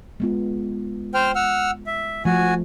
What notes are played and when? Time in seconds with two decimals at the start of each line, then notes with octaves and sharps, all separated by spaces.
0.20 G#3 B3 F4
1.14 C5 G5 F6
1.35 F#5 E6 F6
1.86 E5
2.25 F3 A3 F#4 G#5